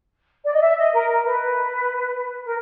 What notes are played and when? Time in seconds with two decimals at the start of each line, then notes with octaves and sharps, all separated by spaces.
0.44 D5
0.53 D#5
0.61 E5
0.77 D#5
0.93 A#4
1.09 A#4
1.25 B4
2.45 A#4